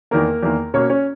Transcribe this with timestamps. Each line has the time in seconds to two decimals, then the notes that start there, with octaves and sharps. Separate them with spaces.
0.11 E2 D#3 A#3 A#4
0.43 E2 D#3 A#3
0.74 B2 A#3 C#4 C#5
0.90 C#4 C#5